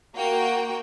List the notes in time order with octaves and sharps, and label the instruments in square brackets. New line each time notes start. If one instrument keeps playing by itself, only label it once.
[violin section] A#3 F#4 G5